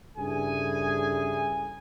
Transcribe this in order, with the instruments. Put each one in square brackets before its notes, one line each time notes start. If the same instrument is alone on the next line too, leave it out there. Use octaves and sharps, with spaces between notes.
[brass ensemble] G2 C#3 E4 G#4 A4 G#5